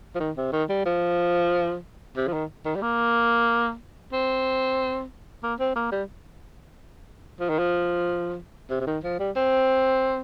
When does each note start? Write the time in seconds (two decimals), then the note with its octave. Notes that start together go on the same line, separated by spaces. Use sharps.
0.15 F3
0.20 D#3
0.37 C3
0.52 D#3
0.69 G3
0.86 F3
2.16 C3
2.27 F3
2.33 D#3
2.65 D#3
2.75 G3
2.82 A#3
4.13 C4
5.43 A#3
5.60 C4
5.76 A#3
5.92 G3
7.40 F3
7.49 D#3
7.59 F3
8.70 C3
8.81 C3
8.87 D#3
9.03 F3
9.19 G3
9.36 C4